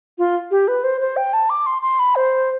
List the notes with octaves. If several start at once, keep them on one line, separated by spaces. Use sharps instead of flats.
F4
G4
B4
C5
C5
G5
A5
D6
C6
C6
B5
C5